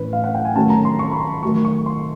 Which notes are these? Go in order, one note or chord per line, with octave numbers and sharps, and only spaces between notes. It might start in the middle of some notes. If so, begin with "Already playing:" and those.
Already playing: A2 E3 A3 C#4 B4
F5
F#5
G5
G#5
D#3 F#3 A3 C#4 A5
A#5
C6
C#6
B5
C6
D#3 F#3 A3 C#6
C#6
C6